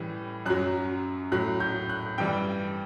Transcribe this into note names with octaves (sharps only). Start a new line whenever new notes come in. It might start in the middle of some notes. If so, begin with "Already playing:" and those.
Already playing: A2 E3 G3
F#2 F#3 F#6
A2 F#3 F#6
G6
F#6
G2 E3 G3 G5